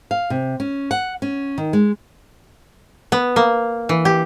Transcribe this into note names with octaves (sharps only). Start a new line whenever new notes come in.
F5
C3
C#4
F#5
C#4
D#3
G#3
B3
A#3
E3
G4